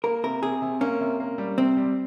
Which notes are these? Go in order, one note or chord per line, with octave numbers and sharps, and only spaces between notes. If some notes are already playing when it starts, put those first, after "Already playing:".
A#3 A#4
C3 A#4
C3 G#4
C3
A#3 C#4
C3
A#3
G3
C3 C4
G3